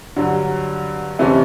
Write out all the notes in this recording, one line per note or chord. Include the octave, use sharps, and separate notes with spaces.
G2 D3 F#3
F2 C3 E3 A3 C#4